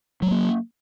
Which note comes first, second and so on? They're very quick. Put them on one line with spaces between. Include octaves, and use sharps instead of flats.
F#3 G#3 A#3